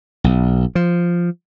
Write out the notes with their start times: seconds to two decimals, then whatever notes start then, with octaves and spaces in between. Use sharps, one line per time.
0.24 B1
0.75 F3